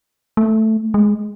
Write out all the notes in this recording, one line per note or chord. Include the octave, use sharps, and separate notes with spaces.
A3
G#3